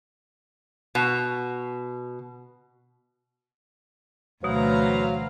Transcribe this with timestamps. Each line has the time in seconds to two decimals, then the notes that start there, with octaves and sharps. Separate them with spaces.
0.95 B2
4.44 D2 B2 E3 F#3 B4 C5 F5 A#5